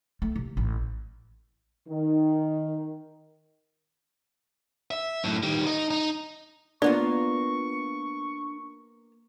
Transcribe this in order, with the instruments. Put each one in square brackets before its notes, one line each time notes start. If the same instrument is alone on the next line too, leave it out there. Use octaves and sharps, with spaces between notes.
[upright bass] A3
C3
A1
[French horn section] D#3
[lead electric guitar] E5
F#2 A2
D#3 G3
D#4
D#4
[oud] A#3 B3 F4 [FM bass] D4 [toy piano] D5 [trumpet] C#6